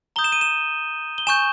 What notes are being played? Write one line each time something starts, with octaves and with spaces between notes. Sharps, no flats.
A#5 D#6 G6 G7
E7
D#7
E7
G7
G#5 C#6 G6 E7